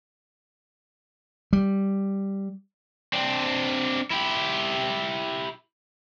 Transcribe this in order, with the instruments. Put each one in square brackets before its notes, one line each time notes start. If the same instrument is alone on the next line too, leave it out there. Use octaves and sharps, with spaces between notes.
[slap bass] G3
[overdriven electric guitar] C4 D4
E4 G4